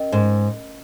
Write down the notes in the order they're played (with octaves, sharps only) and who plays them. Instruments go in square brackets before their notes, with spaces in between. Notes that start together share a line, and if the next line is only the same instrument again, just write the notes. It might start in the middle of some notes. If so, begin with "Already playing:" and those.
Already playing: [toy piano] C#4 A#4 D#5
[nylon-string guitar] G#2